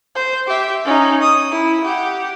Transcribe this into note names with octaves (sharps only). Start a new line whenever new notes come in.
C5
G4 E5
C#4 D#4
D#6
E4
G4 F#5